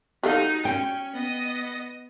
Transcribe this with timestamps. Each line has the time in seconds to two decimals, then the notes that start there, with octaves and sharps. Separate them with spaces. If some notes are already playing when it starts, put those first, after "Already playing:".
0.23 F#3 D#4 G4 A4 F5
0.65 C#4 G5
1.14 B3 D#5